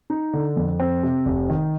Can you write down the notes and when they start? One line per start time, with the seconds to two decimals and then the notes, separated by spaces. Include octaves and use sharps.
0.10 D#4
0.33 D3
0.57 F2
0.80 C4
1.03 C3
1.26 F1
1.50 D#3